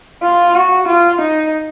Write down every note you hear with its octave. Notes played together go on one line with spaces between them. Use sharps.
F4
F#4
F4
D#4